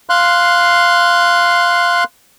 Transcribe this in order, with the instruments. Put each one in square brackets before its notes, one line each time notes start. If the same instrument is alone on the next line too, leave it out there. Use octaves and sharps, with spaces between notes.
[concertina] F5 C6 F#6